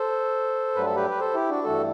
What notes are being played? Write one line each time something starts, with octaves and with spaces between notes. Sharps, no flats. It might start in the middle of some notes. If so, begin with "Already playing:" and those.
Already playing: A4 C5
G2 F#3 A3 B4
A4
G4 B4
B4
A4 C5
E4 G4
D4 F#4
G2 E3 A3 F#4 A4